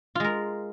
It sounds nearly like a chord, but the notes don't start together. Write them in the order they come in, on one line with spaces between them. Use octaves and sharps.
F4 G#3 A#4